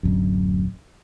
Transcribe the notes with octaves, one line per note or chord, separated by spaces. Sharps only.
D1 F#2